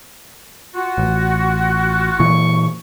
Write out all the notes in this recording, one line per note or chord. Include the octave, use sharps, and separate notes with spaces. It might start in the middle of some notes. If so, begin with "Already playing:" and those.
F4 F#4
A1
A#2 E3 C#6